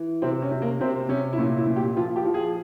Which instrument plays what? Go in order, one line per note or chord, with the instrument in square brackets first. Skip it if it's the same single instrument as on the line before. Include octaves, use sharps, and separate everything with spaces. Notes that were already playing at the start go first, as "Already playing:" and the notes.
Already playing: [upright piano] E3
C3 C4
C#4
C3
A#3
C3 C4
C3 C#4
E4
A#2 C#4
E4
A#2
G4
F3 F4
G4
F3
G#4